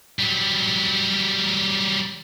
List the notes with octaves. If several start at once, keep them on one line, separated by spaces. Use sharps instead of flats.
F#3 G3